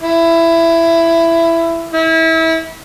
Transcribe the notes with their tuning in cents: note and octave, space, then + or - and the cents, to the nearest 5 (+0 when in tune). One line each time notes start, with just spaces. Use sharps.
E4 +15
E4 -30